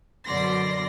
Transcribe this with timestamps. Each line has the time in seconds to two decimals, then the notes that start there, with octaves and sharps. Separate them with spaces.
0.25 F#2 B2 D3 D5 C6 A#6